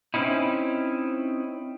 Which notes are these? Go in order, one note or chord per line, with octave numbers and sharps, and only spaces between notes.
C4 C#4 D#4 E4